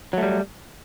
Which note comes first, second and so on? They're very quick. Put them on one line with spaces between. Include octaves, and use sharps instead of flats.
F#3 A3 G3